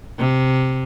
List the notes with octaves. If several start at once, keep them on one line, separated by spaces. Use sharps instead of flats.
C3